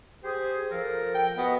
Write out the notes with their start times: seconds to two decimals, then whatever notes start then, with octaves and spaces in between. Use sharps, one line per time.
0.23 G4 G#4 C5
0.71 F3 A4 A#4
1.15 G5
1.37 B3 F#4 D#5